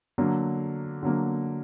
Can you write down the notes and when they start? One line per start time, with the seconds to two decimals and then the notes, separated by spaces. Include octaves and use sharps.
0.18 D3 F#3 A#3
1.03 D3 F#3 A#3